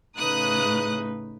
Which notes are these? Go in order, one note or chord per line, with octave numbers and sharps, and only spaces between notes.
A2 C#3 D#4 B4 D#6 F#6